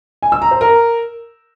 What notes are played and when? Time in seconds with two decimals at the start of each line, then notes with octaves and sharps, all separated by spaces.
0.23 G#5
0.32 E6
0.42 A#5
0.51 C5
0.61 A#4